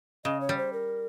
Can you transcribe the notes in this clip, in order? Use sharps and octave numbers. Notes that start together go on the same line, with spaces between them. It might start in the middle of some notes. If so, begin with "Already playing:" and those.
C#3 D#5
C#5
G3
C5
A#4